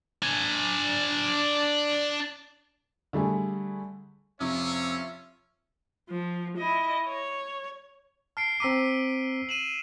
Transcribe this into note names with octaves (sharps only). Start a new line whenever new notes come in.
D4 G#5
D3 G3 A3 G#4
F2 C3 C#4 F4 C#5 E5
F3
E4 D#5
C#5
A5 F6 C7 D7
C4 A#5 D6 E6 B6 D#7
D#7 E7 F#7